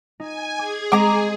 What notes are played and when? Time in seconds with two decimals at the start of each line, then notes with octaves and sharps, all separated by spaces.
0.20 D#4 G#5
0.59 G#4 D6
0.92 G#3 C4 D#5 A#5 D6